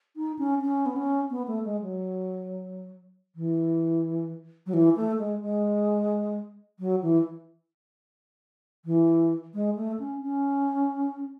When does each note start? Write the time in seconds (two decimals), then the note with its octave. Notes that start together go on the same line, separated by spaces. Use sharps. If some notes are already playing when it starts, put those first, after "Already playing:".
0.16 D#4
0.39 C#4
0.62 C#4
0.86 B3
0.96 C#4
1.30 B3
1.47 A3
1.65 G#3
1.82 F#3
3.35 E3
4.66 F#3
4.73 E3
4.96 A3
5.19 G#3
5.42 G#3
6.79 F#3
7.02 E3
8.85 E3
9.54 G#3
9.76 A3
9.99 C#4
10.23 C#4